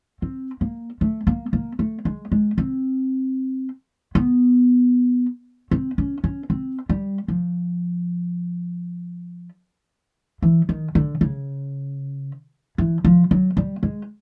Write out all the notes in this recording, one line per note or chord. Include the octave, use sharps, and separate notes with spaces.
C4
A#3
A3
A#3
A#3
A3
G#3
G#3
C4
B3
C4
C#4
C#4
C4
G3
F3
E3
D#3
D3
C#3
E3
F3
F#3
G3
G#3